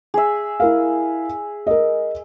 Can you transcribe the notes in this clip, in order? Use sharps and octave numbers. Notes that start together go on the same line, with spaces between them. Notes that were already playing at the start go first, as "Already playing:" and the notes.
G#4 E5
E4 A#4 F5
A#4 D#5